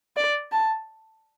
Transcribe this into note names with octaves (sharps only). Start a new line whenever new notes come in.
D5
A5